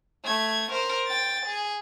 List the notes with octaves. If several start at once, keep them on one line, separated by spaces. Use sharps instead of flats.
A3 G#6
A#4 C5
G5 A6
G#4